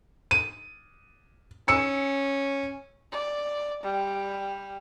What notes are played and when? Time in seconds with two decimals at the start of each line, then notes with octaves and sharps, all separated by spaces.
0.31 D#7
1.68 C#4 E6 C#7
3.12 D5
3.83 G3